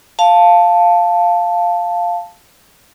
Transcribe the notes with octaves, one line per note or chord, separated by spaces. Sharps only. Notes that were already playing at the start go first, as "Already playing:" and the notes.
F5 A5